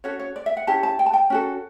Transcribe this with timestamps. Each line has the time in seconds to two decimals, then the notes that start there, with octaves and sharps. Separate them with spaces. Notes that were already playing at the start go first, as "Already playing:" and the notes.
0.04 C#4 F#4 A4 C#5
0.19 C#5
0.36 D5
0.46 E5
0.57 F#5
0.67 C#4 E4 G4 A5
0.83 A5
0.99 G5
1.06 A5
1.13 G5
1.30 C#4 F#4 A4